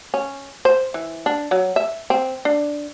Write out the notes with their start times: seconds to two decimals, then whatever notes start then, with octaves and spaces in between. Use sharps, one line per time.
0.14 C#4
0.65 C5
0.94 E3
1.26 D4
1.51 F#3
1.76 E5
2.10 C4
2.45 D4